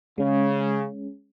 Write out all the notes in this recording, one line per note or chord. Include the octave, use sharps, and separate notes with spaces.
C#3 G#3 C#4